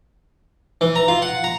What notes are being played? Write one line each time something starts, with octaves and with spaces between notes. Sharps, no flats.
E3
A#5
F4
F#5
A#5